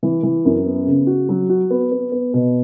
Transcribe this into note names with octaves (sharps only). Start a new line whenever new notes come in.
E3
E3
F#2
B3
C#3
F#4
F#3
F#4
B3
B3
B3
B2